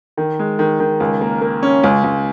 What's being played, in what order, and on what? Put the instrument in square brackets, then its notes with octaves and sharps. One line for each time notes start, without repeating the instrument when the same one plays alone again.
[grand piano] D#3
G#3
D#3
D#3
C#2
A#3
A#3
C#4
C#2
C#2